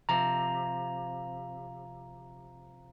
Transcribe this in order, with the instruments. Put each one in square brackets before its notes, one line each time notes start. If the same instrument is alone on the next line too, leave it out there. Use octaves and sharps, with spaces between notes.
[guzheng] C3 F3 [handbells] A#5